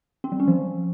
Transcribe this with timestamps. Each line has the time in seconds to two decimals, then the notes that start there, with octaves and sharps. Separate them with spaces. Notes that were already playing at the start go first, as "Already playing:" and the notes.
0.24 C4
0.32 G3
0.40 C#4
0.48 F3